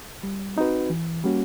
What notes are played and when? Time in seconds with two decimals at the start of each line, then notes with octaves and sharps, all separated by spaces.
0.23 G3
0.57 C4 D#4 F#4 B4
0.90 E3
1.24 G3 A#3 C#4 F#4